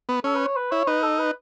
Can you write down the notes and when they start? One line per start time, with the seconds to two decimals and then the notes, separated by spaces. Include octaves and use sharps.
0.09 B3
0.24 C#4 A4
0.35 B4
0.46 C#5
0.56 B4
0.71 E4 C#5
0.87 D#4 B4
1.03 A4
1.19 B4